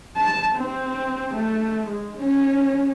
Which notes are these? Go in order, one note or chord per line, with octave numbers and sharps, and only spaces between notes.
A5
C4
A3
G#3
C#4